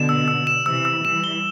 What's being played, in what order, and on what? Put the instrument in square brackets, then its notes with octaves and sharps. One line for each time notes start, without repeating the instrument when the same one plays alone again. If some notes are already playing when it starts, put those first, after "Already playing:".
Already playing: [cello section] B2 D3 [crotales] E7
[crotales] E6
E6
E7
[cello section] C3 E3 [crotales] E6
[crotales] E6
[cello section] E3 G3 [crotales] E7
[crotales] G7